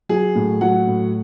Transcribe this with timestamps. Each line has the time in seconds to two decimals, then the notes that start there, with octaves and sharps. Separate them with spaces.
0.09 F#3 G#4
0.35 A2
0.61 F#3 F#5
0.87 A2